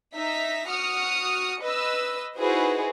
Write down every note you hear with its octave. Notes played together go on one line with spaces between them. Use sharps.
D#4 E5 A#5 B6
F#4 D#6 F6 C#7
B4 D#5 E6
D#4 E4 F#4 G#4 B4 C5